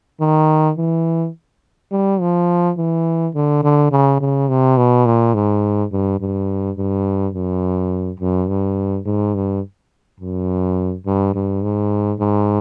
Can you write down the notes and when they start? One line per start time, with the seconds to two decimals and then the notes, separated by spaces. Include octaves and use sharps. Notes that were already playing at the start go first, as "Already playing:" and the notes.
0.21 D#3
0.77 E3
1.92 G3
2.21 F3
2.77 E3
3.34 D3
3.63 D3
3.92 C#3
4.20 C#3
4.49 C3
4.77 B2
5.06 A#2
5.34 G#2
5.92 G2
6.20 G2
6.77 G2
7.34 F#2
8.20 F#2
8.48 G2
9.05 G#2
9.35 G2
10.20 F#2
11.06 G2
11.34 G2
11.63 G#2
12.19 G#2